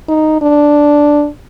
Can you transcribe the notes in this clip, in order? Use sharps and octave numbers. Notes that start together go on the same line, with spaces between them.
D#4
D4